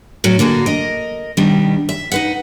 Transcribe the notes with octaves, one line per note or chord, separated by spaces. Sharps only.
A2 F#3 C#4 F#4
D3 A#3 F#4 G#4
A#4 D#5
B2 D#3 G3 B3 D4
E5
D#4 B4 F#5